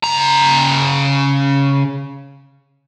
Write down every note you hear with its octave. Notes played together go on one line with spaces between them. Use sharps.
C#3 A#5